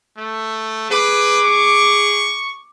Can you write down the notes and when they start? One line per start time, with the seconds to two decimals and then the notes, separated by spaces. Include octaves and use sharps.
0.18 A3
0.90 G#4 B4 D6
1.45 C#6